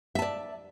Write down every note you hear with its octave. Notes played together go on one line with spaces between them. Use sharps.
D5 E5 A5